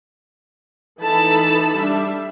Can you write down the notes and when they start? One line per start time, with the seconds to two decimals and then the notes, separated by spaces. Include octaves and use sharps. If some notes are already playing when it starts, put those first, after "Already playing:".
1.00 E3 D#4 A4 A5 B5
1.75 G3 D4 E5